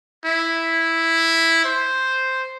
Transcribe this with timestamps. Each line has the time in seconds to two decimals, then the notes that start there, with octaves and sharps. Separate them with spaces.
0.25 E4
1.65 C5